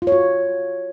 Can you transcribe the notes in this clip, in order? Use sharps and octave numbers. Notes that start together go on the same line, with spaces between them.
F4
C#5
F#4